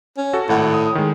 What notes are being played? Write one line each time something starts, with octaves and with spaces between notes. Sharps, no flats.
C#4
F#4 A4
G#1 A2 F#5
D#6
D#3 G#3